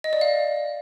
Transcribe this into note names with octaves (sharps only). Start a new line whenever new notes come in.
D#5
D5
F5